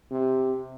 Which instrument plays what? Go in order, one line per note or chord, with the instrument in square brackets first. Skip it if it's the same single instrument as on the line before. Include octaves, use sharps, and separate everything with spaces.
[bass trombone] C3